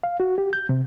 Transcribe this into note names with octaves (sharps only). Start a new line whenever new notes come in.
F5
F#4
G4
G6
C3